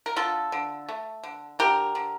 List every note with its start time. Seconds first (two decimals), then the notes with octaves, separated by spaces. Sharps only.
0.06 A#4
0.16 D3 F4 A4
0.52 D3
0.89 A3
1.24 D3
1.59 D3 G4 A#4
1.95 D3